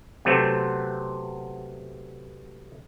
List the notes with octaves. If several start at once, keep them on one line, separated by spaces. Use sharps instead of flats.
C3 F#3 A3 B3 C4